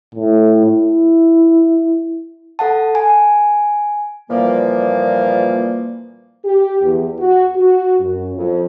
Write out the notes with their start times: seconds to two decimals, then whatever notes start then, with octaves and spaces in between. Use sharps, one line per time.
0.15 A2
0.66 E4
2.59 A4 F#5 A5
2.95 G#5
4.31 A#2 E3 F3 G3 A#3
6.45 G4
6.82 E2
7.19 F#4
7.55 F#4
8.00 F#2
8.35 F2